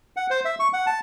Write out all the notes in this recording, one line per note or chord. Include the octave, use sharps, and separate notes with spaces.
F#5
C5
E5
C#6
F#5
A5